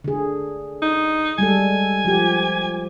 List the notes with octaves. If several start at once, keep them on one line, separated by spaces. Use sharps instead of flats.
D3 G#4
D#4
G3 G#3 A4 G#5
F3 G4